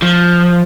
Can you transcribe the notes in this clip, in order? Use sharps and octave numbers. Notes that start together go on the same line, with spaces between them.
F3